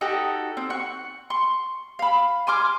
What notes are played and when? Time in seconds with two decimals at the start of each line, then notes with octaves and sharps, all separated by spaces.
0.01 D#4 F#4 G4 A4
0.57 C4
0.70 F#5 C#6
1.30 C6 C#6
1.99 F5 B5
2.47 G#5 C6 D6 F6